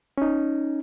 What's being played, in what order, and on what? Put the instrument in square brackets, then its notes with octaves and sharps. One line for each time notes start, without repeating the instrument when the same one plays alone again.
[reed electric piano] C#4 D#4